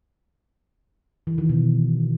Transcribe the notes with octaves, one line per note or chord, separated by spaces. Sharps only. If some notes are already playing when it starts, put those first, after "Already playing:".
E3
D#3
B2